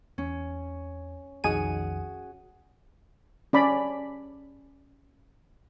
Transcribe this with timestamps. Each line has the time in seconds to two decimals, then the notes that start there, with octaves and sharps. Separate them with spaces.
0.18 E2 C#4
1.44 B1 F2 D#3 F#4 G#4 D#5 G#5 D#7
3.53 C#4 D5 B5 D6